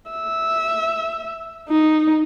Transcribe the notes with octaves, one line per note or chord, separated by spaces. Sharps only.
E5
D#4